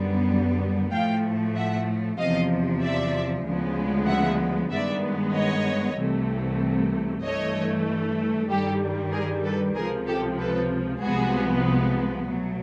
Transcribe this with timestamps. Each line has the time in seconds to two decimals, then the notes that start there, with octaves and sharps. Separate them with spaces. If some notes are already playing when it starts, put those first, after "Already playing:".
Already playing: F#2 D3 G3 B3
0.93 A2 F3 A3 F5 G5
1.55 E5 F#5
2.18 E2 C3 F3 D#5 F5
2.82 D5 E5
3.45 D2 C#3 F3 G#3 B3
4.08 E5 F#5
4.71 G2 D#3 G#3 B3 D5 E5
5.34 C#5 D#5
5.97 C2 C3 E3 A3
7.23 G2 E3 A3 C#5 D#5
8.49 G2 D#3 G3 G4 A4
9.13 G#4 A#4
9.44 A4 B4
9.76 C#2 C3 F3 G#4 A#4
10.07 G4 A4
10.39 A4 B4
11.02 C2 C3 F3 G#3 B3 F#4 G#4
12.28 B2 F#3 A3